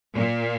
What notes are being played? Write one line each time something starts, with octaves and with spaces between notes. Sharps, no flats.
A#2